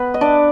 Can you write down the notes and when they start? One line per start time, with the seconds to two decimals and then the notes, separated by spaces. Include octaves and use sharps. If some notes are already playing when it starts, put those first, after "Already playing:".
Already playing: B3 B4
0.14 D#5
0.21 D4 D5